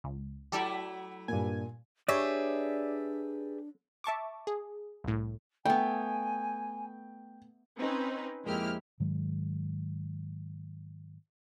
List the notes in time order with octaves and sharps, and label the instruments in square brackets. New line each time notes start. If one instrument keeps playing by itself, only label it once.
[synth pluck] C#2
[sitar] F#3 A3 E4 [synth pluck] G4 A4 D5
[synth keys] G2 G#5 [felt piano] A#2
[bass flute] D4 [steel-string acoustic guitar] G4 G#4 B4 [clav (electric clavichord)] C#5 [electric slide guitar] D5 E5
[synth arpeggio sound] E5 A5 C#6 D6
G#4
C2 A2
[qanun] A3 B3 [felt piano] G5 [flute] G#5
[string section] C4 C#4 D#4 B4
F2 G#3 A#3 E4 G4 F6
[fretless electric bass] G#2 D#3 F#3 G#3